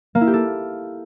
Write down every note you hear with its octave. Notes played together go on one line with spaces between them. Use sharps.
A#3
E4
G4
A4